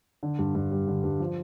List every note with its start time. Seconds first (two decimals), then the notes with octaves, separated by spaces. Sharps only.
0.23 D3
0.39 G2
0.55 G2
0.71 G3
0.88 D3
1.04 G2
1.20 F3